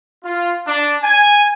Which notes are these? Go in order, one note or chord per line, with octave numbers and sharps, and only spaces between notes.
F4
D4
G#5